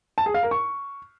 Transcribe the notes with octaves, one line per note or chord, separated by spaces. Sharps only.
A5
G#4
F5
A#4
C#6